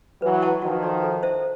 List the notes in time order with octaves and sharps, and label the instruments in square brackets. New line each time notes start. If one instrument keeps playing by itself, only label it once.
[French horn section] E3 F#3 [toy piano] B4
[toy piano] D#5 F#5 A5 C#6
[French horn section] D#3 F3 [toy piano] F#4
[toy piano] A4 D5
A4
C5 E5 A5